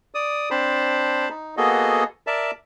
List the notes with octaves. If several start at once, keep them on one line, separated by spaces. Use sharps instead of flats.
D5 D#6
C4 D4 C5 A5 B5
D#4
A#3 B3 F#4 G#4 A4 D#5
A#4 D5 E5 A5